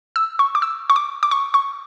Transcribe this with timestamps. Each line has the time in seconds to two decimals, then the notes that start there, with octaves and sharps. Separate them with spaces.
0.16 E6
0.39 C#6
0.55 D6
0.62 E6
0.90 C#6
0.96 D6
1.23 D6
1.31 C#6
1.54 C#6